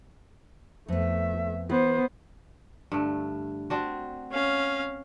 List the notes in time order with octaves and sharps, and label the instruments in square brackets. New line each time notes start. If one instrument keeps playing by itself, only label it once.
[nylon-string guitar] F2 B3 [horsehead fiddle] A3 E5
[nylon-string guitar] E3 [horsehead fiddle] B3 C5
[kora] G2 D3 A3
C4 D4 F#4
[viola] C#4 F5